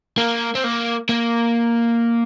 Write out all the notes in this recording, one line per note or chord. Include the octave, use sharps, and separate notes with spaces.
A#3
C4
A#3
A#3